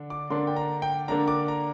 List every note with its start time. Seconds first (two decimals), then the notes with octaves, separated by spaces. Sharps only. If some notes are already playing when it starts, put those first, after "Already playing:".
Already playing: D3 D4
0.10 D6
0.30 D3 A#3 D4 C6
0.47 G5
0.56 A#5
0.82 G5
1.08 D3 A#3 D4 A#5
1.28 D6
1.48 A#5